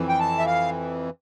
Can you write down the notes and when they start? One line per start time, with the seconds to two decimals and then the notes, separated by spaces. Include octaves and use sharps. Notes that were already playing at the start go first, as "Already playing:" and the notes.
Already playing: F2 E3
0.09 G5
0.20 A5
0.39 E5
0.46 F5